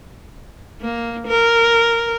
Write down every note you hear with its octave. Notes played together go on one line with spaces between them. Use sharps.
A#3
A#4